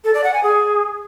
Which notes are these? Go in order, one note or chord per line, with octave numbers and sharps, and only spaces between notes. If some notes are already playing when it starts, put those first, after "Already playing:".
A4
D5
F#5
G#5
G#4